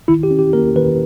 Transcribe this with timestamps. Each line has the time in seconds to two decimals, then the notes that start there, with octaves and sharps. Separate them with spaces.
0.08 D#3 E4
0.23 G4
0.31 C#4
0.39 G4
0.53 A#3 A#4
0.76 D#3 B4